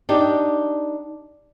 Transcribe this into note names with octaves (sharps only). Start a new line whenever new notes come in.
D4 D#4 G4